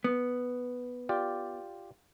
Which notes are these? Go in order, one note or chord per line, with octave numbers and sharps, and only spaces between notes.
B3
F4 G4 D5